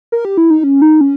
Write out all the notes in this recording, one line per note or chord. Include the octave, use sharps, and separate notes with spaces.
A#4
G4
E4
D#4
C#4
D#4
C#4